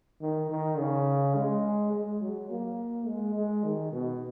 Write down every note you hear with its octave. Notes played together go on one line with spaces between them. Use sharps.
D#3
D#3
C#3
G#3
G#3
F#3
A#3
G#3
G#3
D#3
B2